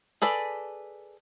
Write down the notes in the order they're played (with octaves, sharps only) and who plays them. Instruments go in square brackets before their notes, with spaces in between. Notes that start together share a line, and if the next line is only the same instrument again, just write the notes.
[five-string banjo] G#4 A4 B4 D5